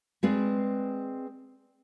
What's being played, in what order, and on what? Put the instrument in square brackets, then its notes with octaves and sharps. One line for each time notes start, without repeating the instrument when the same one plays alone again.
[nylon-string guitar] G#3 C4 G#4 B4 D5